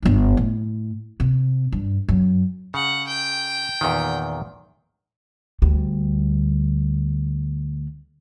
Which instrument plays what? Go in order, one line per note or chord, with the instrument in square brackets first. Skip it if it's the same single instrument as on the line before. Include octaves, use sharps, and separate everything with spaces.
[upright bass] G1 G2
A2
C3
G2
F#2
[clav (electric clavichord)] C#3 [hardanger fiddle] F#5
[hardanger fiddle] G5
[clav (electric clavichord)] E2 A#2 D#3
[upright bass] D2 G3